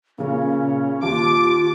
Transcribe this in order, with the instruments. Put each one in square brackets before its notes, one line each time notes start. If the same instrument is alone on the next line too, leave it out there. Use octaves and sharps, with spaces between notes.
[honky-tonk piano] A#2 C#3 [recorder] C#4
[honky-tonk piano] D#2 [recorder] F4 [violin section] D6